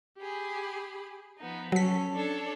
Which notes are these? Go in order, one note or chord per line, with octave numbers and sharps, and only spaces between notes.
G4 G#4 B5
F3 B3 D#4
F#3 C#4 A4 B6
D4 A4 C#5